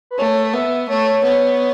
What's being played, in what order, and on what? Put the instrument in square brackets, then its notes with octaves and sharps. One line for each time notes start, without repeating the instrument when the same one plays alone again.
[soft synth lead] B4
[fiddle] A3 [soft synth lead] C#5
[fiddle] B3 [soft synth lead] E5
[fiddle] A3 [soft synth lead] C#5
[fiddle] B3